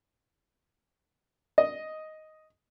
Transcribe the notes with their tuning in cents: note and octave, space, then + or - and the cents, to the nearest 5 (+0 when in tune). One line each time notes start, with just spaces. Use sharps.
D#5 +5